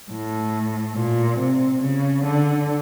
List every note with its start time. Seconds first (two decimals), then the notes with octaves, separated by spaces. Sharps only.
0.11 A2
0.95 A#2
1.39 C3
1.82 C#3
2.25 D3